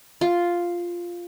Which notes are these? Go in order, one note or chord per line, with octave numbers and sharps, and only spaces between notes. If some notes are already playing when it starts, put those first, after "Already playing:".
F4